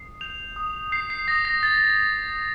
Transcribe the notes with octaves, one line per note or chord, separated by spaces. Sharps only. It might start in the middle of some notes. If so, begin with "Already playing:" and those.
Already playing: D#6 C7
G6 F7
D#6
G6 C7
C7
D#6 A#6
A#6
G6 A6